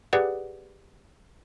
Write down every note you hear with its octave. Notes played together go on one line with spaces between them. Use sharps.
G4 G#4 B4 D5 F#5